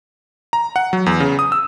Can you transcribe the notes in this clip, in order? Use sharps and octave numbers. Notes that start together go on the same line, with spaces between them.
A#5
F#5
F#3
E2
C#3
D#6
E6